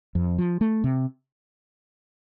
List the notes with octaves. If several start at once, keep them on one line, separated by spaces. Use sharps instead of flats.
F2
F3
A3
C3